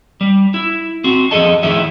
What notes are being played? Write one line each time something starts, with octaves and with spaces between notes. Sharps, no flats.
G3
E4
C4 F#4
F2 G#2 G#4 A4 D#5 A5
F2 D#3 A3 E4 G#4 E5